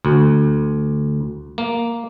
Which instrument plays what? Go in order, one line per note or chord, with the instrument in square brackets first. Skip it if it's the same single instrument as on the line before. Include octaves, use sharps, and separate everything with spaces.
[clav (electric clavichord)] D2
A#3